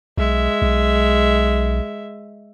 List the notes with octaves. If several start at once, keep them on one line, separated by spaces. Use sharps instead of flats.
B1 G#3 E5
B1